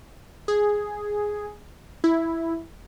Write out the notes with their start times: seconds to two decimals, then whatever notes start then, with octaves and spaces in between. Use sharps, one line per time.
0.48 G#4
2.04 E4